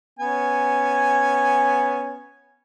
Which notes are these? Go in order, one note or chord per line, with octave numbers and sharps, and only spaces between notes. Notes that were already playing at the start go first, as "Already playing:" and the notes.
B3 C#4 G#5